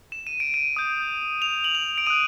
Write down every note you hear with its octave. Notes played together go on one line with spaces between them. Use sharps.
E7
D#7
D7
D#7
D#6 G6
F7
F#7
F7
D7
D#6 F#6 D#7